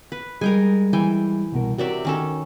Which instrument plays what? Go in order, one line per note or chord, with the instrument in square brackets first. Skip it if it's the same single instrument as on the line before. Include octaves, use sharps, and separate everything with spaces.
[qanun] B4
[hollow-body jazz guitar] G3 G#3 [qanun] A#4 G5 G#5
[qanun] E3 G5 G#5
[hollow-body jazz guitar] C2 B2 A#4
[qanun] C3 D5 E5 [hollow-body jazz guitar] F#4 A#4 C#5
[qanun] D#3 C#4 A4